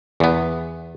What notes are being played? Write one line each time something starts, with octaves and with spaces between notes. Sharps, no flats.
E2 B3